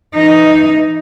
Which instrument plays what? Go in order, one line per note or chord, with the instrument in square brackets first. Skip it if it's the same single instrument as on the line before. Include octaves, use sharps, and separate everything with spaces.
[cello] E3 D#4